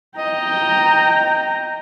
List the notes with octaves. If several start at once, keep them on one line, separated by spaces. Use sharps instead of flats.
D#5 G5 A#5